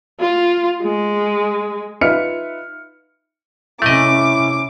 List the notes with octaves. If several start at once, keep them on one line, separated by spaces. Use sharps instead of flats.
F4
G#3
D#4 F4 B4 E5 F6 C#7
C3 A3 C#4 E4 D#5 D6